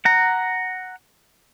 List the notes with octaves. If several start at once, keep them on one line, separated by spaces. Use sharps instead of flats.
F#5 A#5